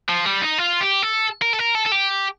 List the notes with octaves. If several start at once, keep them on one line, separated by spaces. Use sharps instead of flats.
F3
G3
D#4
F4
G4
A4
A#4
A4
A#4
A4
A4
G4